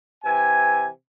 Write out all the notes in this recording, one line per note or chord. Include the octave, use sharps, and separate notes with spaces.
C3 E3 G#5